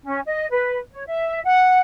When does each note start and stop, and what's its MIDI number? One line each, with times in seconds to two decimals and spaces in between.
0.04 0.19 61
0.26 0.46 75
0.50 0.78 71
0.92 1.04 73
1.06 1.40 76
1.44 1.81 78